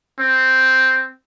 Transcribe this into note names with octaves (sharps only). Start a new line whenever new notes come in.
C4